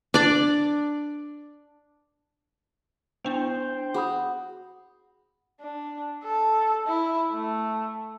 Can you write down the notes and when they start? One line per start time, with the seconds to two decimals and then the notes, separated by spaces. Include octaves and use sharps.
0.14 D4 D5
3.25 B3 D4 E4 C5 G5
3.94 F#4 G#4 B5 D#6
5.60 D4
6.24 A4
6.87 E4
7.32 A3